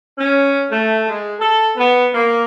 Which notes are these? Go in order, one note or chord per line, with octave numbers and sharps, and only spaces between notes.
C#4
A3
G#3
A4
B3
A#3